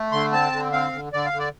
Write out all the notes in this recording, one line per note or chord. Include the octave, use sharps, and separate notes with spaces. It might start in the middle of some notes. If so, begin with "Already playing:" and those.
Already playing: A3
D3 C6
C4 A5
D3
C4 F5
D3
D3 D5
F5
D3
D5